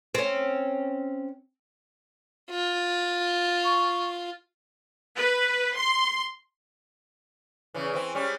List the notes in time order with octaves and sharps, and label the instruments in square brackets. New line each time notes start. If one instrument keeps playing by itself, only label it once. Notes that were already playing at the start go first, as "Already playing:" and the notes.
[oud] C4 C#4
[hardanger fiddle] F4
[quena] C#6
[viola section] B4
C6
[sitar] E2 C#3 E3
E3 C4
G3 G#3 C#4